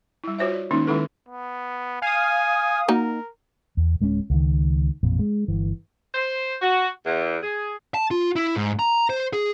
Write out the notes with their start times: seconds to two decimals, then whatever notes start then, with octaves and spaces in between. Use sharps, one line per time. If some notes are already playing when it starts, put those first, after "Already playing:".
0.24 G3 E4
0.38 F4 F#4 C5 C#5 E5
0.54 D5
0.71 D#3 G#3 A#3 C#4 D#4
0.87 D#3 G#3 C#4 E4 A4 B4
1.28 B3
2.02 F5 G#5 D#6
2.88 A#3 D#4 F#4 A#4
3.77 E2
4.00 D1 G#3 B3 C#4
4.30 C#2 D#3
5.03 A1 F2 A#2
5.19 G#3
5.48 G1 E3
6.14 C5
6.61 F#4
7.05 E2
7.42 G#4
7.94 A5
8.11 F4
8.36 E4
8.56 G#2
8.79 A#5
9.10 C5
9.33 G#4